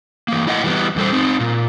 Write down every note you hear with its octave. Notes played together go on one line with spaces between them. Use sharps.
E3 A#3
E4 D5 D#5 F#5
E3 G3 B3
E2 G3 A4 C5
C4 D#4
A#2